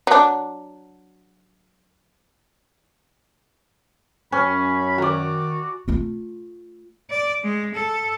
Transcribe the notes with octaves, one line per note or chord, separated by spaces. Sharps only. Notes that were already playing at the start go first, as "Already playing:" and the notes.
F#3 D4
F#2 C#4 B5
D#3 F#4 D5 A#5
A3 F4
D5
G#3
A4